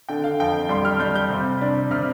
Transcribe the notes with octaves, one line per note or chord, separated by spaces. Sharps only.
D3 G5
F5
F2 G5
G3 C6
F6
G3 G6
G6
C3
D4
C3 F6